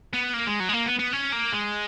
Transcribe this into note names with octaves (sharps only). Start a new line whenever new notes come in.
B3
A#3
G#3
F#3
G#3
A#3
B3
B3
C#4
A#3
G#3